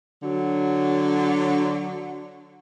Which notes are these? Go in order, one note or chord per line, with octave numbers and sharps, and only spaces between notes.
D3 F#3